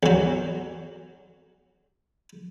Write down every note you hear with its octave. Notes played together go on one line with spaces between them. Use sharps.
E2 F#3